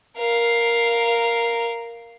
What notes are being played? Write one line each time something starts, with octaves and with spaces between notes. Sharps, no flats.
A#4 F5